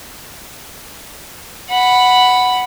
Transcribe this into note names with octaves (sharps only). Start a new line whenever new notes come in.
F#5 B5